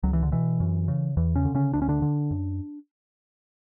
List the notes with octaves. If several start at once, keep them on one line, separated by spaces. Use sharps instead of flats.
C#2 F#3
E3
D3
B2 E3
F#2
C#3
E2 E3
C#3 C#4
D3
C#3 C#4
D2 D4
C#4
D3 D4
D3
F#2